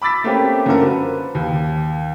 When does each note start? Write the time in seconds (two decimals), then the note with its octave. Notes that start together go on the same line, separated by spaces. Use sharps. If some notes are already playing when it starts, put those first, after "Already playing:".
0.02 B5 D6 E6 A6 B6
0.24 A3 A#3 C4 C#4 G4
0.66 F#2 D3 F4 A4 A#4
0.82 B4 C5
1.35 D#2